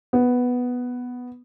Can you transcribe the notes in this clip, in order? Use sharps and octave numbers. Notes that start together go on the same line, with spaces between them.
B3